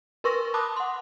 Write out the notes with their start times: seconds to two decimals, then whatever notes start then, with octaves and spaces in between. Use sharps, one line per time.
0.24 A#4 B4 C6 C#6 E6 A#6
0.54 A5 B5 D6 D#6 F#6
0.76 F#5 C6